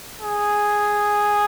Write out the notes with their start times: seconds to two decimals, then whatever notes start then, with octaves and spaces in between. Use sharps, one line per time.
0.21 G#4